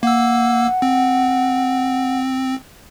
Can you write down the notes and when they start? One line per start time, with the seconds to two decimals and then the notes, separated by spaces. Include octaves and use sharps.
0.03 A#3 F#5 E6
0.82 C4